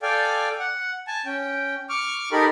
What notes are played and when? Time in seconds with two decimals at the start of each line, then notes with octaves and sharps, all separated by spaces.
0.02 A4 D5 F5 G5 G#5
0.60 F#5
1.07 G#5 A5
1.26 C#4 G5
1.89 C#6 D6 F6
2.32 D#4 G4 A4 A#4 B5